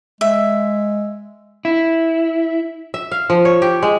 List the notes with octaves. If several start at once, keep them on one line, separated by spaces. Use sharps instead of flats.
G#3 E5
E4
E5
F5
F3
C#5
G4
G#3